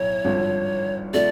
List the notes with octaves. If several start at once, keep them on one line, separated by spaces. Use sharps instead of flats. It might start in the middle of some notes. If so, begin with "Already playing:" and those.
Already playing: B1 A2 C#5
G#1 G2 D3 F3
D3 F3 A3 D5